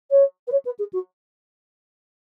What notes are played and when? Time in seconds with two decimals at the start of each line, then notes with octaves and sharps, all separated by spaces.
0.11 C#5
0.47 B4
0.52 C#5
0.65 B4
0.79 G#4
0.93 F#4